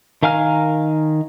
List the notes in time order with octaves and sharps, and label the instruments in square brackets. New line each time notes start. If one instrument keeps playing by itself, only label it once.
[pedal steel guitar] D#3 A#4 F5 G#5 F6